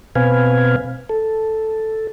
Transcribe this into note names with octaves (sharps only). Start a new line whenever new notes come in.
B2 C4 B4 F5 G#5
A4